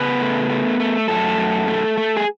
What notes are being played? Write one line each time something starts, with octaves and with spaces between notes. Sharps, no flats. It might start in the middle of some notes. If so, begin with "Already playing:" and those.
Already playing: C#3 B3 B4
A3
A3
A3
F#2 A3 A4
F#2
A3
A3
G#4